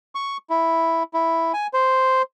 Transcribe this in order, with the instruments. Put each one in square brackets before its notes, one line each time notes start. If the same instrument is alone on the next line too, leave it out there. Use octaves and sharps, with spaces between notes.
[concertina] C#6
E4
E4
G#5
C5